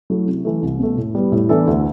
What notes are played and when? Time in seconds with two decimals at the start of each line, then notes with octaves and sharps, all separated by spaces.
0.10 F#3 A3 E4
0.27 C3
0.45 E3 A3
0.62 C2
0.80 B2 A3
0.97 A2
1.15 G3 B3
1.32 A2
1.49 E3 B3 D4 A4
1.67 D2